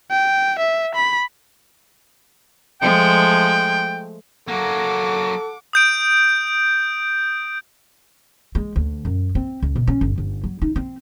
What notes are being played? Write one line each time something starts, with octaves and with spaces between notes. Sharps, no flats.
G5
E5
B5
F3 G#3 A3 G5
F#3 A#3 A4 F#5 D6
D#6 G6 D7
G#3
D2
F#2
C4
C#2
B2
C#4
G1
G1
F#3
D#4
C4